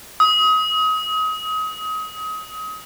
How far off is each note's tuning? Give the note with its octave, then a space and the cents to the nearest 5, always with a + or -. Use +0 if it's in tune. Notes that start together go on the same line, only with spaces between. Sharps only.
D#6 +30